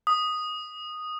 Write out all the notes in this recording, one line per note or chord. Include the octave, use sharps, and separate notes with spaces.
D#6